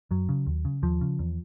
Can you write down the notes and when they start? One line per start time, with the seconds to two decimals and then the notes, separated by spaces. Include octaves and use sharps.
0.11 F#2 F#3
0.29 C#3
0.47 D#2
0.65 C#3
0.82 D#2 F3
1.01 C#3
1.19 E2